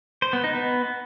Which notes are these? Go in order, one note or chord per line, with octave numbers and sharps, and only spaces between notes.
C5
B3
D#4
B3